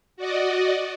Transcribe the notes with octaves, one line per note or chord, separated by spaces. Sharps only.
F#4 D5 D#5